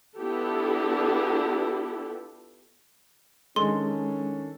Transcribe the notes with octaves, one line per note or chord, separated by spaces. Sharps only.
B3 D4 E4 F4 G4 A4
D#3 G#3 C#4 D4 A4 C6